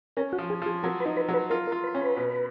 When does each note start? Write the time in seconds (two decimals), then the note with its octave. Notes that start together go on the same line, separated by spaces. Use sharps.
0.17 C#4 A#4
0.33 F#4
0.38 F3
0.50 G#4
0.62 F3 G#4
0.83 F#3 A#4
1.00 B4
1.05 D#4
1.17 B4
1.28 F#3
1.34 B4
1.50 F4 A#4
1.67 A#4
1.72 F4
1.84 B4
1.94 C#4
2.01 B4
2.17 B2